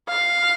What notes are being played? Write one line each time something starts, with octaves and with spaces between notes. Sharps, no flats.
F5